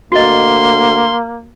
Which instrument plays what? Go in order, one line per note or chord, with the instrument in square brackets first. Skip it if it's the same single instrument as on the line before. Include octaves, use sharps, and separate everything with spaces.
[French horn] D2 [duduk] A#3 [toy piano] F#4 D#5 [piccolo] C6